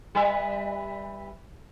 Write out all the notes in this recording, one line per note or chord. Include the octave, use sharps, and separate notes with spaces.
G3 B4 E5